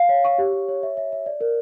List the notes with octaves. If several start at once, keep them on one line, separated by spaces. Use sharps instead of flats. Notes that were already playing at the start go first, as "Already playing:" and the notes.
Already playing: F5
C#5
C#6
G4
G4
C#5
E5
E5
E5
D5
A#4